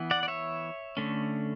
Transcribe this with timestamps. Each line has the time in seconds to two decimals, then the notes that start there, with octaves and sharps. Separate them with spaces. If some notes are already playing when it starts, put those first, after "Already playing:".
Already playing: E3 B3
0.11 D5 F#5
0.23 D5
0.28 C#5 E5
0.97 D3 A3 C#4